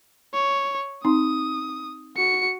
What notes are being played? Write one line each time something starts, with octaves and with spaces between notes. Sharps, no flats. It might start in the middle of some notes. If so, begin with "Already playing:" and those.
C#5
C4 D#4 C6 D#6
F#4 C#7